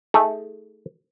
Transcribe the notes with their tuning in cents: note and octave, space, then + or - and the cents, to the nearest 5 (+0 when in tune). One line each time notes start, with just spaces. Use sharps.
A3 -5 D#4 +30 G#4 -5